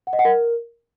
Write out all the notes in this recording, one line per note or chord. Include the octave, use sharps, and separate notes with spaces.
F#5
D#5
F#5
A#4